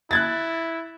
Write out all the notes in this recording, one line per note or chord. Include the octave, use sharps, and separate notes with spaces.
E4 F#6 G#6 A6